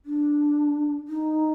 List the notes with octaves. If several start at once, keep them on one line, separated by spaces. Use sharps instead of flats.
D4
D#4